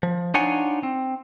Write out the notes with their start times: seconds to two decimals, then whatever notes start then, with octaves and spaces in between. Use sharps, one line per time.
0.03 F3
0.34 D4 D#4 F4 C#5 F#5 G#5
0.83 C4